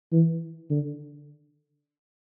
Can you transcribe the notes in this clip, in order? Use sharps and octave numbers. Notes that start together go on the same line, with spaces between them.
E3
D3